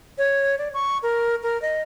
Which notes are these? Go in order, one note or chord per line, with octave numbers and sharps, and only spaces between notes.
C#5
D5
C#6
A#4
A#4
D#5